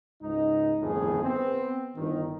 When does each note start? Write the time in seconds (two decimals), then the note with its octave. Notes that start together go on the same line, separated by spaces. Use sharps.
0.21 C#2 G#2 D#4
0.82 G1 F2 A2 D#3 G#4
1.22 B3 C4
1.96 G1 D#3